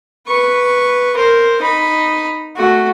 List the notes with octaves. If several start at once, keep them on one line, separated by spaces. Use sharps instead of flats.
B4 C#6
A#4 C5
D#4 B5
A3 F#4